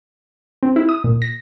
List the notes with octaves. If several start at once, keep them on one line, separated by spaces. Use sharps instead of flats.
C4
E4
D#6
A#2
A#6